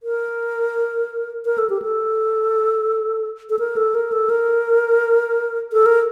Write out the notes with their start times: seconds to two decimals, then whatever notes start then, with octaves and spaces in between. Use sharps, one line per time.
0.03 A#4
1.45 A#4
1.58 A4
1.70 G4
1.82 A4
3.50 A4
3.59 A#4
3.76 A4
3.95 A#4
4.12 A4
4.30 A#4
5.73 A4
5.86 A#4